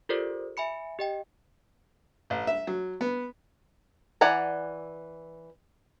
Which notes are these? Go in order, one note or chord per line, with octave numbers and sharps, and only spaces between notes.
F4 G4 A4 A#4 C5 D5
E5 G#5 B5 C#7
G4 D#5 G5
A1
E5
F#3
B3
E3 D5 F#5 G#5 A#5